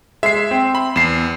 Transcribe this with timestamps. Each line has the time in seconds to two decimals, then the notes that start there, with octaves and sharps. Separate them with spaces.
0.23 G#3 E5 C7
0.51 C4
0.75 B5
0.96 E2 C7 E7